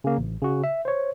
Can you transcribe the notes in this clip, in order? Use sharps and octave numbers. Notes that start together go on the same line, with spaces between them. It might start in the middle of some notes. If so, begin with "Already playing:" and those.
C#3 A#3
A1
C#3 F#4
E5
C5 C#5